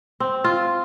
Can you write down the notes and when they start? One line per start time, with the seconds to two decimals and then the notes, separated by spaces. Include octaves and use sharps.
0.20 C4
0.44 F4